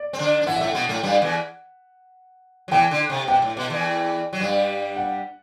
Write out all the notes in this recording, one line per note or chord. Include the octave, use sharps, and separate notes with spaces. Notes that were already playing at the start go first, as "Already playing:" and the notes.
Already playing: D5
C4
D3 D4
D4
E3 E4 F#5
A2 A3 E5
F#5
B2 B3
A2 A3
G2 G3
E2 E3
F#3
E2 E3 G5
D3
C3
B2 G5
A2
B2
E2 E3
F#3
G2 G3
F#5